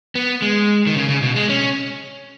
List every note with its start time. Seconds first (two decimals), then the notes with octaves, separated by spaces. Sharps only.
0.15 B3
0.42 G#3
0.87 D#3
0.96 C#3
1.09 C#3
1.23 B2
1.36 G#3
1.49 C#4